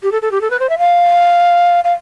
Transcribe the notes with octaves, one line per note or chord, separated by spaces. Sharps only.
G4
A4
A4
G4
A4
B4
C5
E5
F5
F5